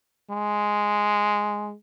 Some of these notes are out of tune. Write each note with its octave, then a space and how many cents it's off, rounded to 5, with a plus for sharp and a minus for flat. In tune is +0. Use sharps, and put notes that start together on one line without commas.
G#3 +0